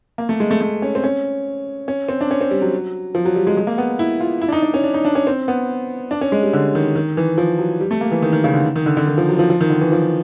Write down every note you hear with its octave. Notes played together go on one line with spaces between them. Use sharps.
A#3
A3
G#3
A3
A3
C#4
C4
C#4
C#4
C4
D4
C#4
C4
G3
F#3
F3
F#3
G3
G#3
G#3
A#3
B3
E4
F4
E4
D4
D#4
D4
C#4
D4
D#4
D4
C#4
C4
B3
D4
C#4
G#3
G3
D3
D#3
D#3
E3
F3
F#3
G3
A3
A#3
E3
D#3
D#3
C#3
D3
D#3
D3
D3
D#3
F3
F#3
F3
F3
D#3
D3
E3
F3